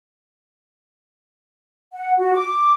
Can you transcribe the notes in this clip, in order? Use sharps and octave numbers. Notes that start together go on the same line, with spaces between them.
F#5
F#4
D6